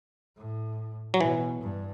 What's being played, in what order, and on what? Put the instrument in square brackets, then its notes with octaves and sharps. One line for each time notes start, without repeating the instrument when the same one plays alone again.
[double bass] A2
[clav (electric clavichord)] F#3
[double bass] B2 [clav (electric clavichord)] E3
[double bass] G2